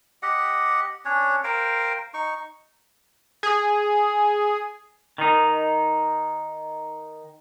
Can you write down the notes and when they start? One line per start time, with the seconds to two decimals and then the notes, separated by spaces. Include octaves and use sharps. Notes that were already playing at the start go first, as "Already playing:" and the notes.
0.23 G4 D#5 F#5
1.05 C#4 D4 C#5
1.44 A#4 C5 F5 G5
2.14 D#4 C#6
3.43 G#4
5.18 D#3 D#4